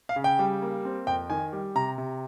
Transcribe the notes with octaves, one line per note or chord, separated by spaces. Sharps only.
F5
C#3
G5
G3
A#3
C4
F2 G5
D#3 G#5
G3
C3 A#5
C3